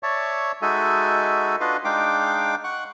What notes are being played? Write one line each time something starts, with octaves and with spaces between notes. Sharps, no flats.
C#5 D5 E5 A5 C#6
G#3 D#4 F#4 A4 E5 G#5
D4 F4 F#4 B4 D#5 F5
G#3 D4 D#4 F5 G5 D6
F#5 C#6 F#6